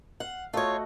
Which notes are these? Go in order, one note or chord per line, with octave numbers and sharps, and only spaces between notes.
F5 F#5
A3 F4 F#4 C#5 D#5